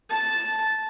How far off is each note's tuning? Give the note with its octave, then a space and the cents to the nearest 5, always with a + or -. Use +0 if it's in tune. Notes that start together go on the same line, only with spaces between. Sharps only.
A5 -10